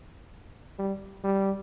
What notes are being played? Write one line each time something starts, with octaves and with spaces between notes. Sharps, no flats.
G3
G3